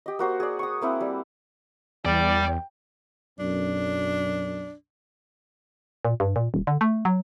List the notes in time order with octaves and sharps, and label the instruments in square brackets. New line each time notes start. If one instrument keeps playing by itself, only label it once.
[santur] G4 D#5
A#3 F#4 C5
G#4 D5
C#6 D#6
A#3 C4 E4
G3
[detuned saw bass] E2 [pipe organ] G3 [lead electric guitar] D5 [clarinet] G5
[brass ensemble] B1 F#2 [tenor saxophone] D4
[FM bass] A#2
G2
A#2
D#1
D3
A3
F#3